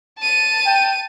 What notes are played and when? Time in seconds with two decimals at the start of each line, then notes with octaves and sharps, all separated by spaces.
0.19 A5 D#7
0.66 G5